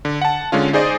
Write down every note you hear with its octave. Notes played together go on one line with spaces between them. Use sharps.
D3
F#5 A5
D3 G#3 C#4 F4
D#4 G#4 C5 D5 D#5